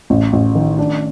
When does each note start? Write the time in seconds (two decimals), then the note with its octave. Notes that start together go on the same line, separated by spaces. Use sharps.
0.10 A1
0.33 A1
0.55 D#3
0.79 D4